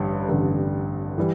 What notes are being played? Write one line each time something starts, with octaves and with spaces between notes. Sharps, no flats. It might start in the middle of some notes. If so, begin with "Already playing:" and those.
Already playing: A1 G2 D3
A1 G2 D3
E3 G3